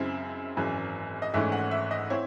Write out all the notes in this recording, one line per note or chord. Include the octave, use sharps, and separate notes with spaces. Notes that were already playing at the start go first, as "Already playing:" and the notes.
Already playing: F#2 C#3 G#3 C4 E4
G#1 F#2 E3 G#3
D#5
G#1 G#2 E3 A3 C#4 E5
F#5
E5
D#5
C4 E4 C#5